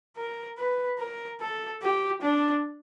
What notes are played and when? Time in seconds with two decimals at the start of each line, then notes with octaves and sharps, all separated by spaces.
0.17 A#4
0.58 B4
0.99 A#4
1.41 A4
1.82 G4
2.22 D4